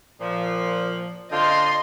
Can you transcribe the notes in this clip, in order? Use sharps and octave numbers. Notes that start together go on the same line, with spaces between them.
A#2 F3
D3 C4 F4 D#5 C6